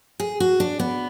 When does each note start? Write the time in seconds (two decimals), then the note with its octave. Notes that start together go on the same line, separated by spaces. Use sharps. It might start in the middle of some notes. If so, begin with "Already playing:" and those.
0.20 G#4
0.40 F#4
0.60 D4
0.80 B3